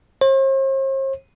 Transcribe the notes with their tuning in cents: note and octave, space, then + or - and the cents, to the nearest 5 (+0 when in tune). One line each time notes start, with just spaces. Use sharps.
C5 +45